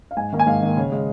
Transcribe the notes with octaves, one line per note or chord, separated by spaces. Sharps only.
F5
G#2 G#5
D#3 A#3
G#5
G#2 F5
D#3 A#3
C#3
G#3